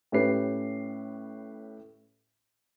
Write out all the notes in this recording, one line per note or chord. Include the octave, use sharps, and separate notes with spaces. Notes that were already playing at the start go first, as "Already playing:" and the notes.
A2 C#4 G4 B4 C7